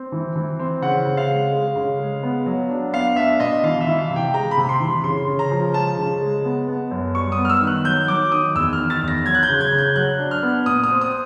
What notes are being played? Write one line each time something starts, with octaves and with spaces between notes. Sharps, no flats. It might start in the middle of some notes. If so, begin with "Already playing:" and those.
Already playing: C4
E3
E3
C4
C#3 F#5
C#3
F5
G#3
G#3
C#3
G#3
B3
F#3
D4
B3 F5
D4 E5
B2 D#5
E3 F5
E5
E3
F5
C3
G5
G#3 A#5
B5
C3
C6
E3
C#3 C6
C#3
A#5
F3
G#3 A5
C#3
G#3
B3
B3
F#2
G3 C#6
D#6
B3
F6
E6
D#3
F#6
F#3 G6
F#3 D6
D#3 D#6
E2 E6
F6
D#3
A6
E2
A#6
F#3 G#6
F#6
G6
C#3
G#6
C#3
G6
F#3 F#6
D4
F6
B3
A#2 D#6
D#6
C4
D#6